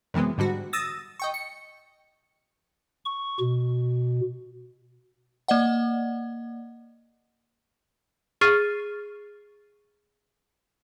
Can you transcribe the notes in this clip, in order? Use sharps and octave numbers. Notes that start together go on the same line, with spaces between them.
F#2 C3 E3 G#3 B3
G#2 D3 G3 F#4
D#6 E6 A6 A#6
D#5 G5 C#6
C#7
C#6
B2
A#3 D5 D#5 F#5
G#4 C#6 F6 A6 C7 D#7